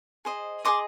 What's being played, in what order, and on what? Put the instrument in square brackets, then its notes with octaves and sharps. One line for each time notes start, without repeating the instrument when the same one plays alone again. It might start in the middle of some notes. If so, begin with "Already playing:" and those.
[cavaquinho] G#4 C5 D#5
G#4 C5 D#5 C6 D6